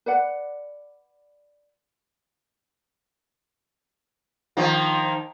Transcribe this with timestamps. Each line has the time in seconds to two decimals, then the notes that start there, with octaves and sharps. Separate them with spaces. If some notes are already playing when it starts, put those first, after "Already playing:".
0.06 B4 D5 F#5
4.57 D#3 F3 A#3